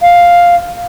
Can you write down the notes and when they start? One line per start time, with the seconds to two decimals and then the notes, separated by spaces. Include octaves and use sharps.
0.02 F5